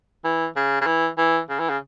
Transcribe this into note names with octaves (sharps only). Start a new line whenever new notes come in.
E3
C#3
C#3
E3
E3
C#3
E3
C#3